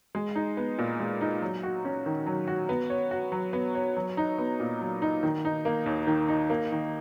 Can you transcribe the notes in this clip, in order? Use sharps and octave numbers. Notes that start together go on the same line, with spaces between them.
G#3
D#4
B3
A#2
G#3
D#4
F#3
F#4
C#4
D#3
F#3
F#4
B3
C#5
F#4
F#3
B3
C#5
F#3
D#4
B3
A#2
F#3
D#4
D#3
D#4
A#3
D#2
D#3
D#4
A#3
D#3